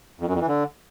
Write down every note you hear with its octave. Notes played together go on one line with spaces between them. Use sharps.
F2
F#2
F2
E3
D3